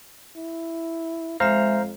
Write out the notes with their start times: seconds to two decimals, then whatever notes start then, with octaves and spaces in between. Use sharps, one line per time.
0.37 E4
1.40 F2 G#3 C5 E5 F5 A#5